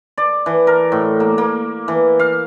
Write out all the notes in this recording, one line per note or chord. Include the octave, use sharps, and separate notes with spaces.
D5
E3
A#4
A2
A#3
A#3
E3
F5